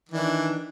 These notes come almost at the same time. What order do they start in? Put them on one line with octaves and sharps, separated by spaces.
D#3 E3 D4